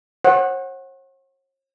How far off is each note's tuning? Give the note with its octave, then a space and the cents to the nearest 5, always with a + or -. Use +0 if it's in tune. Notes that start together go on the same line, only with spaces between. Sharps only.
C#5 -45 F#5 +0